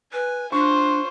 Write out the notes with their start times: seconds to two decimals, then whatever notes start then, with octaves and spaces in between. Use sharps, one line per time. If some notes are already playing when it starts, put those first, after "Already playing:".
0.13 B4 G#5
0.52 D4 F4 C5 C#6